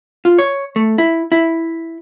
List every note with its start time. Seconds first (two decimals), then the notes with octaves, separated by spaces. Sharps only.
0.25 F4
0.39 C#5
0.76 A3
0.98 E4
1.32 E4